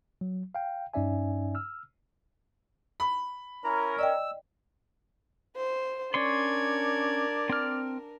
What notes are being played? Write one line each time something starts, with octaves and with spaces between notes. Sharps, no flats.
F#3
F5 G5
G2 C#4 D#4 D5 E5 G#5
E6 F6
B5
C#4 E4 A#4 A#5
D5 D#5 G5 E6
C5
C#4 D4 A#4 C#5 D5 C6 G#6
C4 F6